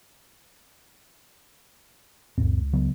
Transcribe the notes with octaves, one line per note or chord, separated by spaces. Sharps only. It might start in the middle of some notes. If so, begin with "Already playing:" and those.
C#2 F#2 A#2 C4
C#3 F#3 B3